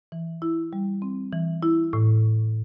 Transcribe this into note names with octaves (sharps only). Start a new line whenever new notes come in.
E3
E4
G3
C4
E3
E4
A2